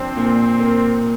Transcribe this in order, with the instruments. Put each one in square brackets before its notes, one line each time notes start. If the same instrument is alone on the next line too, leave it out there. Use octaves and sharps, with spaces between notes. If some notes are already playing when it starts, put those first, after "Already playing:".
Already playing: [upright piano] F3 D4 [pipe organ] C4
[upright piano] A#2
A#3